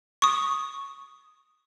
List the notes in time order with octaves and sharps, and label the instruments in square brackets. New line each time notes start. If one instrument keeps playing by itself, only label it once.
[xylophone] C#6 D#6